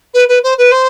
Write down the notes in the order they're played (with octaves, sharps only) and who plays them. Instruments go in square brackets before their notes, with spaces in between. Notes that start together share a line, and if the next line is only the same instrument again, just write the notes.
[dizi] B4
B4
C5
B4
C5